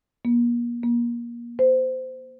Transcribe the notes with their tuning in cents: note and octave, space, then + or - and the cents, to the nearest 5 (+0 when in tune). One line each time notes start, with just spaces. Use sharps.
A#3 +40
A#3 +30
C5 -20